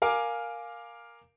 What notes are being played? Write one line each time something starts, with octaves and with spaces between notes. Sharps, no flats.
A#4 F5 G#5 D6